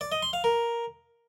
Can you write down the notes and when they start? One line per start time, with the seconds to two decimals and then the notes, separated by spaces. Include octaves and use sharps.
0.01 D5
0.12 D#5
0.22 C6
0.33 F5
0.44 A#4